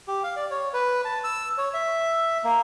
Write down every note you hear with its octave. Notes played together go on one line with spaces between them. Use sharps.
G4
F5
D5
C#5
B4
A5
E6
C#5
E5
A#3